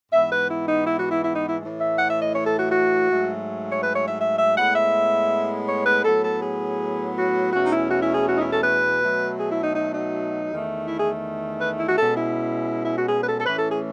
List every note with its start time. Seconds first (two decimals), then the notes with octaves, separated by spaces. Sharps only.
0.12 G#2 E3 B3 E5
0.31 B4
0.50 E4
0.68 D#4
0.87 E4
0.99 F#4
1.11 E4
1.24 E4
1.36 D#4
1.48 E4
1.61 A2 E3 A3
1.79 E5
1.98 F#5
2.09 E5
2.22 D#5
2.34 C#5
2.47 A4
2.59 F#4
2.72 F#4
3.09 G#2 F#3 A3
3.72 C#5
3.83 B4
3.95 C#5
4.07 E5
4.20 E5
4.38 E5
4.57 A2 G#3 B3 F#5
4.75 E5
5.68 C#5
5.86 B4
6.05 A2 F#3 B3 A4
6.24 A4
6.42 G#4
7.16 F#4
7.53 E2 B2 A3 C#4 F#4
7.64 D#4
7.72 E4
7.91 F#4
8.03 E4
8.14 G#4
8.27 F#4
8.36 D#4
8.40 E4
8.52 A4
8.64 B4
9.01 B2 F#3 A3
9.38 G#4
9.51 E4
9.63 D#4
9.76 D#4
9.95 D#4
10.50 E2 D#3 A3
10.86 E4
10.98 G#4
11.61 B4
11.79 E4
11.89 F#4
11.97 B2 G#3 C#4 A4
12.16 E4
12.85 E4
12.97 F#4
13.09 G#4
13.22 B4
13.28 A4
13.40 A4
13.46 A2 E3 A3 C#4 B4
13.59 A4
13.70 G#4